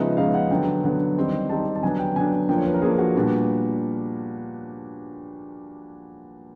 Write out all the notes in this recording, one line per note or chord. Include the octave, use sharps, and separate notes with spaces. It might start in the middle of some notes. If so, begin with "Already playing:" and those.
Already playing: C#3 F3 G#3 B3 D#4 E5
C#3 F3 G#3 B3 D#4 F5
F#5
D3 F#3 B3 G5
D3 F#3 B3
D#3 G3 C4 D#4
D#3 G3 C4 D#4 A5
A5
D3 F#3 B3 D4 G#5
G5
D3 F#3 B3 D4 G#5
F3 A#3 D4 G5
C#5
B4
A#4
F3 A#3 D4 G#4
F#4
A#2 G3 B3 D4